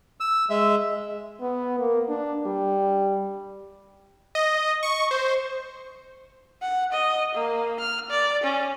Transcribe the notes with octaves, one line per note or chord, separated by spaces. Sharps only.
E6
G#3 E5
B3
A#3
D4
G3
D#5
C#6
C5
F#5
D#5
A#3
F6
D5
C#4